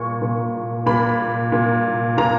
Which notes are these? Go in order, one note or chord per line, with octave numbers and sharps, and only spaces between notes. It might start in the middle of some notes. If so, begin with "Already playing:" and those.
Already playing: A#2 C#6
A#2
A#2 B5
A#2
A#2 A#5